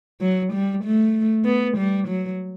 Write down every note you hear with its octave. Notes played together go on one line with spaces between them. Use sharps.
F#3
G3
A3
B3
G3
F#3